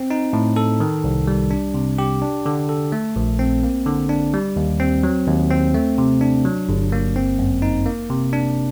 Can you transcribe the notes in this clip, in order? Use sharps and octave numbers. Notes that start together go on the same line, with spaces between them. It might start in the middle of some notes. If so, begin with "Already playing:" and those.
Already playing: C4
D#4
A2
A4
D#3
C2
G3
D4
C3
G4
D4
D3
A4
A3
A#1
C4
A#3
D3
D4
G3
D#2
C4
F#3
D#2
C4
A3
C3
D4
F#3
G1
A#3
C4
F#2
D#4
A#3
C3
D4